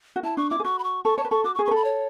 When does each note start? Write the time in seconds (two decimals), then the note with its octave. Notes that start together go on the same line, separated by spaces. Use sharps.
0.16 F#4
0.23 E4 A5
0.37 D4 C#6
0.50 E4 D6
0.60 G#4
0.64 F#4 C#6
0.79 B5
0.84 C#6
1.05 A4 C#6
1.18 C#5 A5
1.25 B4
1.31 A4 C#6
1.44 F#4 D6
1.55 C#6
1.59 G#4
1.65 B4 C#6
1.71 A4 B5
1.85 C#5